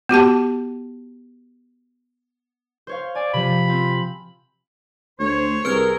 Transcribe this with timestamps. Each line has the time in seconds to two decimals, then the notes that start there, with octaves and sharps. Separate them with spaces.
0.09 B3 F#4 G4 A5
2.87 C5 C#5 F5
3.15 D5 G#5
3.34 C3 F3 B5
3.68 C4 F4
5.20 D2 C5 C#5
5.65 C2 G#4 A#4 B4 F6 G#6